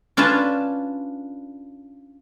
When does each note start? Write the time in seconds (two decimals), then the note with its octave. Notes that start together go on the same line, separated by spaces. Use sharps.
0.17 C#4 D4 F4 B4 A5